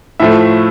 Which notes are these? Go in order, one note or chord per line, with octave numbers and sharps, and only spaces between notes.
A2 F3 A3 E5